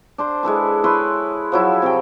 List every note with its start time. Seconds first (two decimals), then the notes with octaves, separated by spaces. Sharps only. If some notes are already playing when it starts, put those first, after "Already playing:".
0.18 D4 C5 C6
0.43 G#3 E4 A4 B4
0.84 E4 B4 C#5 C6
1.52 F3 F#3 E4
1.82 C3 F#4 F5 G5